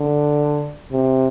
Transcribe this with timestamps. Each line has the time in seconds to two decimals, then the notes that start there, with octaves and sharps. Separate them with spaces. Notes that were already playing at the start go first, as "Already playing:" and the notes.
Already playing: D3
0.92 C3